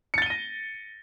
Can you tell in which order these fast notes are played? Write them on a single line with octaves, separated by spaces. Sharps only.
C#7 A6 G7 D#7 A#6